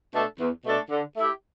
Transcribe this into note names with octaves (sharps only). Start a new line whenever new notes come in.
B2 A3 D4 A4
E2
B2 A3 D4 A4
D3
A3 E4 G4